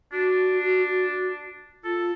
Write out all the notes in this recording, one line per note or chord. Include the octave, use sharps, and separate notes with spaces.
D4 F#4
F4 A4